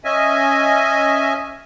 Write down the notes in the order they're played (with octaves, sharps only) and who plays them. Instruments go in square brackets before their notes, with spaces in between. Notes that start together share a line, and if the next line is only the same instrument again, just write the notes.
[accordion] C#4 D#5 E5 G#5